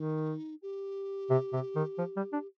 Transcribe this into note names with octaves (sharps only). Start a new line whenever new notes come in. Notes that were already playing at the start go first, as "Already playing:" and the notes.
Already playing: D#3 D#4
G4
C3
C3
D#3
F3
G3
D4